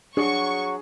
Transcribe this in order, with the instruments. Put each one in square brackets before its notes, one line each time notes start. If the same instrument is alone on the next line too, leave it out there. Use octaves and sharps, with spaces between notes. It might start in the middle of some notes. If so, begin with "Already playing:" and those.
[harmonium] F#3 F#4 [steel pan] D4 [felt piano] G#4 [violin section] C#6